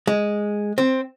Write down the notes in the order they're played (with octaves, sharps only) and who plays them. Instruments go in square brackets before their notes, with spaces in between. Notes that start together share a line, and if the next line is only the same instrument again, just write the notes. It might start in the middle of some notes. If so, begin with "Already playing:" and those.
[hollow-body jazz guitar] G#3
C4